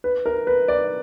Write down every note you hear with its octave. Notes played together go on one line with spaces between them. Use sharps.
B4
A#4
B4
D5